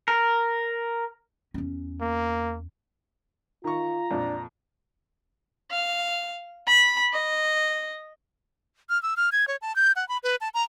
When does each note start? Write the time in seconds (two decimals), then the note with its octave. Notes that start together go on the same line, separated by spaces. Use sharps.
0.08 A#4
1.54 E2 C#4
2.01 A#3
3.64 D#3 F4 A#5 C#6
4.11 F2 A#2 D4
5.71 F5
6.67 B5
7.13 D#5
8.90 F6
9.03 E6
9.17 F6
9.32 G#6
9.48 C#5
9.62 A5
9.76 G6
9.96 F#5
10.09 B5
10.23 B4
10.41 A5
10.54 A#5